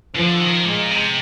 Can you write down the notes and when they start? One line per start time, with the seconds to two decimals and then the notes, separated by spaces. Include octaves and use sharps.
0.15 D3 F3
0.40 D#3
0.65 A#2 G#3
0.91 C3